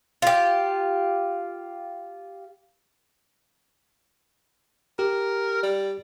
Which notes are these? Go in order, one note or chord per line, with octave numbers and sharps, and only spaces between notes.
F4 G4
G4 A#4
G3